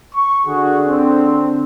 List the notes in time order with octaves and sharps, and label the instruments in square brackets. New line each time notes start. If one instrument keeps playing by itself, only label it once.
[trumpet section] C#6
[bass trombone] D3 [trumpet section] F#4 G#4
[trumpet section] C4